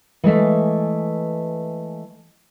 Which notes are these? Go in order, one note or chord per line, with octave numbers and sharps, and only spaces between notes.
E3 G#3 A3 E5